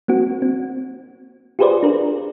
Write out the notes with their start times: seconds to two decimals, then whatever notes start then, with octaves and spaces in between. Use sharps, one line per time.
0.08 A#3 C4 F#4
0.42 C4
1.59 F4 G4 G#4 B4 C5 D5
1.83 D4 A#4